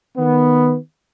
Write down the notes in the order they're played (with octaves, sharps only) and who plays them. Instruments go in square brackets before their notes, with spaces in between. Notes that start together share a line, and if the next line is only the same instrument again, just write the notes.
[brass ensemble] D#3 B3